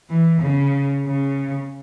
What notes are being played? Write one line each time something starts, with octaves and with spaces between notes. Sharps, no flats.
E3
C#3
C#3